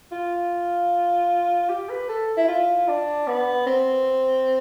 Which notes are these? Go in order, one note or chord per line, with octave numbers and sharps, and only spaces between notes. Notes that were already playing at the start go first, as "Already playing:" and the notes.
F4
G4
B4
A4
E4
F4
D4
B3
C4